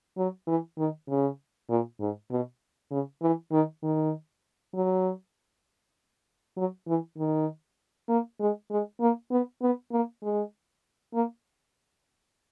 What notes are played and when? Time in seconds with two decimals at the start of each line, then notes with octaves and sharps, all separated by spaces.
0.17 F#3
0.47 E3
0.78 D#3
1.09 C#3
1.70 A#2
2.00 G#2
2.31 B2
2.91 C#3
3.22 E3
3.52 D#3
3.83 D#3
4.74 F#3
6.57 F#3
6.87 E3
7.18 D#3
8.09 A#3
8.40 G#3
8.71 G#3
9.00 A#3
9.31 B3
9.62 B3
9.92 A#3
10.23 G#3
11.14 A#3